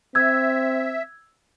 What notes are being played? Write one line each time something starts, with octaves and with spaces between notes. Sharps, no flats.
C4 E5 E6 G#6